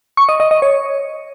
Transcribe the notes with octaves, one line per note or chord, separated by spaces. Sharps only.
C#6
D#5
D#5
D#5
C#5